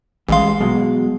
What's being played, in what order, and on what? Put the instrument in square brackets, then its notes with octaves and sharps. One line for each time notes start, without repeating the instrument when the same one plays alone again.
[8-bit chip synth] A1 F5 [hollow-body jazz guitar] E3 G#3 C6
[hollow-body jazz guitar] B2 F#3 G#3